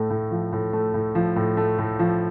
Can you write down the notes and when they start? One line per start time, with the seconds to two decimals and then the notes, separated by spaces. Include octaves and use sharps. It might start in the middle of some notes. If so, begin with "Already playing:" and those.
Already playing: A2 A3
0.10 A2
0.31 F3
0.53 A2
0.73 A3
0.94 A2
1.15 F3
1.36 A2
1.57 A3
1.78 A2
1.99 F3